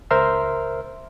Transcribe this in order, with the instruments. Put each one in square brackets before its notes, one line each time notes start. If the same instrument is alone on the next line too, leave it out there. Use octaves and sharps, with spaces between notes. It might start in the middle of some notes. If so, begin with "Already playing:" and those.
[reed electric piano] C#2 A#4 C5 E5 C6 F6